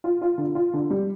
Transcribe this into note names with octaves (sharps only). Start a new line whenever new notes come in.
F4
F4
D3
F4
D3
G3